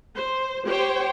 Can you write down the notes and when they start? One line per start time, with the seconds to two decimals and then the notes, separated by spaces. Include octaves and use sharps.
0.14 C5
0.67 G4 C5 C#5 G5